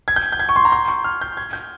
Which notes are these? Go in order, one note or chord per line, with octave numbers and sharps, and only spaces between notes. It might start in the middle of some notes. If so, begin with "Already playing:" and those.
G#6
G6
G6
G#6
C#6
C6
A#5
C6
C#6
F6
G6
G#6
G6